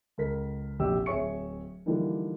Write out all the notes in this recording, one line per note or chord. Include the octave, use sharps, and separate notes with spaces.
C#2 A4 A#4 B6
F1 A#1 F#4 G4 E6
D1 G#4 C#5 E5 C#6 C#7
D3 E3 F3 G3 A#3 D#4